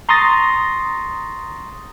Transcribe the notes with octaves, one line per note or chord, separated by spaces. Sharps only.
A#5 C6 C#6 D#6 A6 A#6